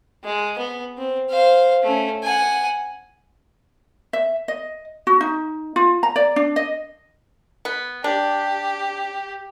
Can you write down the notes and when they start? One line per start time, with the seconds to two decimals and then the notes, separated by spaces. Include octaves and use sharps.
0.24 G#3
0.59 B3
0.98 C4
1.30 C5 F5
1.84 A3 C#4
2.23 F#5 G#5
4.13 E5
4.48 D#5
5.07 F#4
5.21 D#4
5.76 F4
6.03 A#5
6.16 D5
6.36 D4
6.56 D#5
7.65 B3
8.04 D4 G4